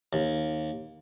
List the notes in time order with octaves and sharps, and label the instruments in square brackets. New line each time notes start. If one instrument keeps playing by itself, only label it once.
[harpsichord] D#2